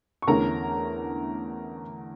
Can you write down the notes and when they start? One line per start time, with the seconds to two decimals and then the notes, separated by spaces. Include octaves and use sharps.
0.22 C#6
0.27 E2 D3 A3 C#4 A#4 A#5